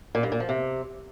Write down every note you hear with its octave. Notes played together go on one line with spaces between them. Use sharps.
A#2
G2
A#2
F3
C3